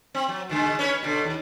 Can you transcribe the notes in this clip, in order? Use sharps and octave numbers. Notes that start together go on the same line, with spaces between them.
C4
F#3
B2 D3 G#3
C#4 B4 C#5
B2 D3
D#2